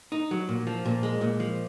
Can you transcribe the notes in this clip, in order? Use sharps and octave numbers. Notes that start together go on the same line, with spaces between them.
D#4
F#3
A#2
F3
A#2
G#3
A#2
F3